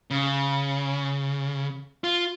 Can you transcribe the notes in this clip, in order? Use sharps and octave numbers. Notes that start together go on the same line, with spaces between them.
C#3
F4